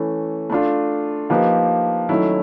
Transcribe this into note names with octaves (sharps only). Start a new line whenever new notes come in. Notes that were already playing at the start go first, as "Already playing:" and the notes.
Already playing: E3 A3 C#4
A3 D4 F4
F3 A#3 D#4 G4 B4
D#3 F#3 A3 C#4 E4